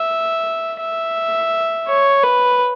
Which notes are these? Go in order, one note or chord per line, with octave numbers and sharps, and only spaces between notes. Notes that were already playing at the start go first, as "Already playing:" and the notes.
Already playing: E5
E5
C#5
B4